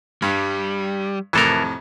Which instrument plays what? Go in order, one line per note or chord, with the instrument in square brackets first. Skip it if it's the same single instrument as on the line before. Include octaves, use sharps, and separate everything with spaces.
[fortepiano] G2 [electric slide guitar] G3
[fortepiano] F2 A2 C3 [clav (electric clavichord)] E3 A4 A#4